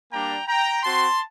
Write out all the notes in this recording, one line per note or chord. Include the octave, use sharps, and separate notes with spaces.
G3 A#3 D4 G5 A#5
G5 A#5
C4 F#4 A5 C6